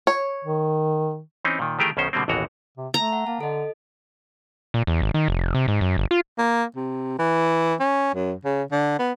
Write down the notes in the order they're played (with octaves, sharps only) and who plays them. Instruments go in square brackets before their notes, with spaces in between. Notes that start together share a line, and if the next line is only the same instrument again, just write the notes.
[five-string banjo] C#5
[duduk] D#3
[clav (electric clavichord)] E3 C4 C#4 D#4
A#2 D#3
D#3 E3 A3 G4 G#4 A#4
B1 B2 D#3 C#4 C5
B2 D3 G3 A#3 C4
A1 D#2 B2 E3 F#4 A#5
[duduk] C3
[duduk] A3 [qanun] A#5
[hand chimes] F#5
[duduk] A#3 [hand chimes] A5
[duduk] D3 [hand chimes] A4 D#5
[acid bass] A#2
E2
G#1
D#3
F1
C3
G#2
F#2
G1
F4
[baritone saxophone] A#3
C3
E3
C#4
F#2
C#3
D3
B3